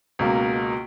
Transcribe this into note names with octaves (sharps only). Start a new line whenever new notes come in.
C#2 B2 A#3